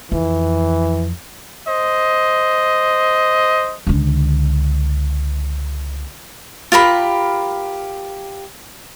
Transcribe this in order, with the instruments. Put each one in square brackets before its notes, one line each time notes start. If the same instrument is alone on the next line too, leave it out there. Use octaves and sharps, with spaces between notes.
[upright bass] F2 [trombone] E3
[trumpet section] C5 D#5
[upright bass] C#2 D3
[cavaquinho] F4 G4 A#4 B5